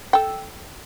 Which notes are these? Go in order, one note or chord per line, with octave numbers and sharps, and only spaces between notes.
A4 G5